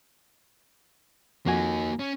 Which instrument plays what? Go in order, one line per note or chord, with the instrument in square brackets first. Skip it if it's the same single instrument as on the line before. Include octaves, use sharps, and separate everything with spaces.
[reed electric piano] F2 F#4 G#5 [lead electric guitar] A#3 D#4
[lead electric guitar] C#4